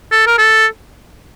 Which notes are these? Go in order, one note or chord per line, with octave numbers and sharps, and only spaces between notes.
A4
A#4
A4